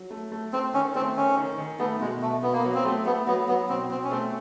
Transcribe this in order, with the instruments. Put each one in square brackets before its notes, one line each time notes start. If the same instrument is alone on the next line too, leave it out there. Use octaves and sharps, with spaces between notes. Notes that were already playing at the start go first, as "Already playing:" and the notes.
Already playing: [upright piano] F#3
A3
A3
[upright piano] A3 [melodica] C4
[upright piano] D#3 [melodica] C#4
[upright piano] A3 [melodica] C4
[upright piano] D#3 [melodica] C#4
[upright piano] D#3
D#3
[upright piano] A3 [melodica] B3
[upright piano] B2 [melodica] G#3
[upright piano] B2 [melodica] A3
[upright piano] B2 [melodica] B3
[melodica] A#3
[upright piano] F#3 [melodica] B3
[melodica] C4
[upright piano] A3
[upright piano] A3 [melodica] B3
[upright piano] F#3 [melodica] B3
[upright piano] F#3 [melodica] B3
[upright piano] B2 [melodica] C4
[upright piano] B2 [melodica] C4
[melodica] C#4
[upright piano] A3 [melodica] C4